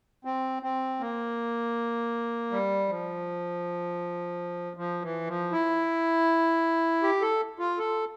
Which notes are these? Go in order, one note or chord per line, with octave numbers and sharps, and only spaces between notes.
C4
C4
A#3
G3
F3
F3
E3
F3
E4
G4
A4
F4
A4